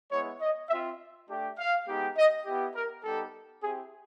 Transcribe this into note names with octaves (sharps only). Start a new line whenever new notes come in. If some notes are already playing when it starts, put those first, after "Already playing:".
G#3 B3 E4 C#5
D#5
C4 F4 E5
A3 D4 G4
F5
G#3 B3 D#4 G4
D#5
B3 E4 G4
A#4
G3 B3 D#4 G4 A4
C4 E4 G4 G#4